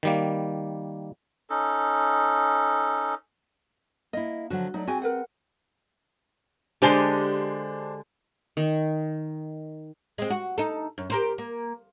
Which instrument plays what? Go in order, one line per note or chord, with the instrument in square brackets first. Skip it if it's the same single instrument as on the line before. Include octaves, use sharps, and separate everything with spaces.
[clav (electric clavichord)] D#3 G3 A#3
[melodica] C#4 D#4 A4
[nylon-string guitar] A#3 E4 [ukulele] D#5
[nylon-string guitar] D3 F3 F#3 [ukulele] F#4
[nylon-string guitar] F#3 A3 D5 [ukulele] D#4
[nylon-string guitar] C4 G#4 [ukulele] F#4 G5 G#5
[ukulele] A#4 B4 F#5
[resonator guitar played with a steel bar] D3 G#3 G4 [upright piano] D4 C5 G7
[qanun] D#3
[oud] G#3 C4
F#4
D#4 A4
F#2
G4 A#4 C5
A#3